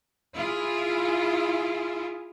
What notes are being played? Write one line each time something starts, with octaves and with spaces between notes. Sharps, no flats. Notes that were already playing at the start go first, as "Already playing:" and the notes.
E4 F4 G#4